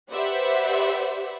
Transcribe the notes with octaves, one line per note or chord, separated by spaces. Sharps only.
G4 B4 C5 D5 E5 F#5